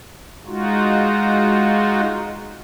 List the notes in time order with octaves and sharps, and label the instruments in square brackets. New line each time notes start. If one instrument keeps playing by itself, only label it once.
[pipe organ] G#3 D#4 F4 F#4